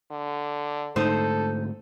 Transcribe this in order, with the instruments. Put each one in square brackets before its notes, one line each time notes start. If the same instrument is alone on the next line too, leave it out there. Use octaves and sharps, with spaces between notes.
[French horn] D3
[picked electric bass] G#2 D3 A3 [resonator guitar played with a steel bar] D#4 C5 [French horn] A4